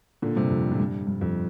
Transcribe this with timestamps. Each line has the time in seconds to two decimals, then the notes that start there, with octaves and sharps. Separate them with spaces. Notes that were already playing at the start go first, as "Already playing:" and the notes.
0.22 A#2 D3
0.36 G2 C3
0.50 F2
0.72 A#2
0.79 G2
1.07 G2
1.21 F2